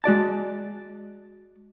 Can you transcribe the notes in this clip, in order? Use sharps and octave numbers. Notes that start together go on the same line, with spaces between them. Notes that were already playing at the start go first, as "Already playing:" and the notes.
G#3 F#4 D5 A5